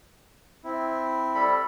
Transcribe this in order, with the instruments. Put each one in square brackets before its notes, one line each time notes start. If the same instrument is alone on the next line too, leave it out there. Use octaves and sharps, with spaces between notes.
[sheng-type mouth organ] C4 E4
[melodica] G3 A4 B5